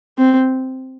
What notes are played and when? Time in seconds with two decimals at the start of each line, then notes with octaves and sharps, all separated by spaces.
0.18 C4